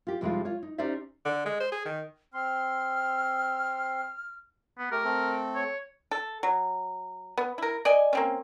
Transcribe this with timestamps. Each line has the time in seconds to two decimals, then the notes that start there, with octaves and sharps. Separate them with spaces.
0.07 F4 G4
0.21 F2 C3 G3 G#3 D#4 F4
0.45 F4 C#5
0.63 D#4
0.78 C#4 D#4 G4 C5 D5 E5
1.25 D3
1.46 G#3
1.60 C5
1.72 G#4
1.85 D#3
2.34 C4 C6 F6
4.79 B3
4.91 A3 G4 A#4
5.04 A3 C4 A4
5.55 C#5
6.11 A4
6.43 F#3
7.37 B3
7.58 E4 A#4
7.85 D5 D#5 G#5
8.13 A#3 C4 C#4